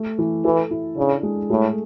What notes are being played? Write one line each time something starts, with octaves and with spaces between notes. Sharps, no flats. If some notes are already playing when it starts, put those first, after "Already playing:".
Already playing: A3
E3
E3 A4
E4
C#3 D4
G#3
A2 A3